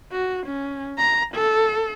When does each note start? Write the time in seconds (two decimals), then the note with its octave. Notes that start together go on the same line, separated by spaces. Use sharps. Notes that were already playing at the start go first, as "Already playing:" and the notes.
0.12 F#4
0.46 C#4
0.98 A#5
1.34 A4